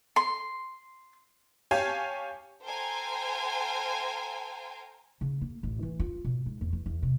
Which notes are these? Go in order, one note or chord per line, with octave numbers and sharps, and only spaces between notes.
C6
G4 C#5 F5 G#5 A5
A4 C5 F5 G5 G#5 A#5
C#3
A#3
A1
E3
F4
B2
G#2
E2
E3
E2
C3